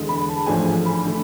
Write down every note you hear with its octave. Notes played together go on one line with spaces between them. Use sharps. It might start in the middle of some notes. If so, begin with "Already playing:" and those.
Already playing: E2 D3 G#3
B5
A5
A1 G#2 F3 A3 D4 G#5
G#5
B5
D3 A3